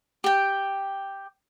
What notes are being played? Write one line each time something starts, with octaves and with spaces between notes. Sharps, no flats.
G4 G5